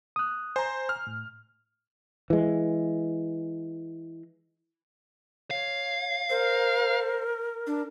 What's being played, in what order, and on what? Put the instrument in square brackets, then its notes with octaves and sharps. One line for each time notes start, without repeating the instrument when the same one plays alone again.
[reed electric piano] D#6 F#6
[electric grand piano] C5 [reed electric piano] G#5 A#5
[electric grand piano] F6
[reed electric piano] A2
[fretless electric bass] E3 G#3
[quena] C#5 [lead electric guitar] F5
[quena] A#4 [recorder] C5
[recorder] D4